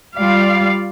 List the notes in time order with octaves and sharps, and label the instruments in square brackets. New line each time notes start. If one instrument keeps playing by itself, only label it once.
[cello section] G3 F4 D5 F5